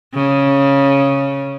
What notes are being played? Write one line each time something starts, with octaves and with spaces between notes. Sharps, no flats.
C#3